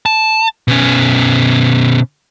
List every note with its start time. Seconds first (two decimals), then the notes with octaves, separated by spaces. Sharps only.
0.06 A5
0.68 B2 C#4